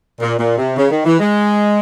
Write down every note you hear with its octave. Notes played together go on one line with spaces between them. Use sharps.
A#2
A#2
C3
C#3
D#3
E3
G#3